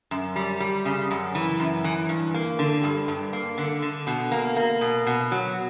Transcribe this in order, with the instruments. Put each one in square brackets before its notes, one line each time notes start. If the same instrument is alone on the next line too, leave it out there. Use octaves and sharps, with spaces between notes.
[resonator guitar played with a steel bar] F#2
G3
G3
C#3
F#2
E3
F#2
E3
G2
A#3
D3
G2
G2
A#3
D3
D3
B2
A#3
A#3
B2
B2
F#3